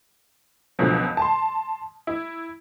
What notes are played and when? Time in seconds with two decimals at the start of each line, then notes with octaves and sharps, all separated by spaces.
0.79 C#2 B2 D3 F3 F#3
1.17 A5 C6
2.07 E4